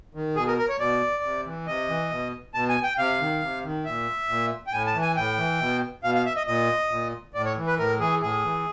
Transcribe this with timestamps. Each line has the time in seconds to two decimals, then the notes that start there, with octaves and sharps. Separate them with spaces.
0.15 D#3
0.36 B2 G#4
0.47 A#4
0.58 A#4
0.69 C#5
0.80 B2 D5
1.23 C3
1.45 E3
1.67 C3 D#5
1.89 E3
2.11 B2
2.54 B2 A5
2.69 G#5
2.83 G5
2.98 C3 F5
3.20 D#3
3.42 C3
3.63 D#3
3.85 A#2 E5
4.29 A#2
4.67 G5
4.72 A2 G#5
4.87 A5
4.94 E3
5.02 G#5
5.16 A2 G5
5.38 E3
5.60 B2
6.03 B2 F5
6.15 F5
6.25 E5
6.36 D#5
6.47 A#2 D#5
6.91 A#2
7.34 A2 D5
7.45 C#5
7.56 E3
7.67 B4
7.78 A2 A#4
8.00 E3 G#4
8.22 A2 G#4
8.44 E3